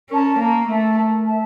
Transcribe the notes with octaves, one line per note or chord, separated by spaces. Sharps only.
C#4 A#4 D5 A5
A#3 A#4
A3 E5 A5
A#4
E5 A5